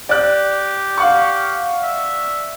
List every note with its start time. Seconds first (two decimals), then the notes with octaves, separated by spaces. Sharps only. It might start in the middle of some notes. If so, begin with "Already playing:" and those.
0.09 G4 D5 F#6
0.98 F5 F#5 C#6
1.83 E5